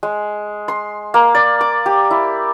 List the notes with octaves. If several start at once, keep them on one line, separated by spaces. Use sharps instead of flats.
G#3
C6
A#3
D5
D6
G4
E4